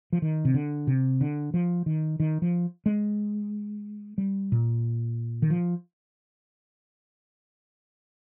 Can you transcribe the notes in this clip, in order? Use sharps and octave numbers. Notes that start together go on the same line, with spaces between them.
F3
D#3
C3
D3
C3
D3
F3
D#3
D#3
F3
G#3
G3
A#2
D#3
F3